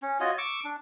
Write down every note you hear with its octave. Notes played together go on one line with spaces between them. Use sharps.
C#4
F4 F#4 C#5 D#5
C#6 D6 E6
D4